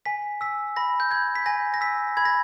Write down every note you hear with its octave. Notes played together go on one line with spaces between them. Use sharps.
G#5 B6
E6 B6
B5 A#6
G6
G6 G#6
B6
G#5 A#6
A#6
E6 B6
B5 G#6
A#6